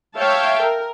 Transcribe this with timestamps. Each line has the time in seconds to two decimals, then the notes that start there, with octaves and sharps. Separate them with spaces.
0.17 C#5 E5 F5 G5 A5
0.62 A#4